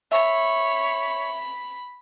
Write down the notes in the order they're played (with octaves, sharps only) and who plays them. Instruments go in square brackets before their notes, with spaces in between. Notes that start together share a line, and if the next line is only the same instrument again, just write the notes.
[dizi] C#5 [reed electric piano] E5 [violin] B5